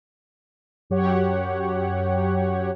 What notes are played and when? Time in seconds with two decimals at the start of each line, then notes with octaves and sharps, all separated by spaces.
0.90 F#2 F#3 G4 C#5 F#5